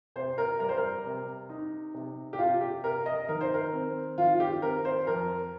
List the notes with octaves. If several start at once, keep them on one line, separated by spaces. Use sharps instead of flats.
C3 C5
A#4
G3 A#4
C5
A#4
C3
D#4
C3
G4
C3 F4
G4
C3 A#4
D#5
D#3 A#4
C5
A#4
C4
D#3 F4
F4
G4
C4 A#4
C5
F2 A#4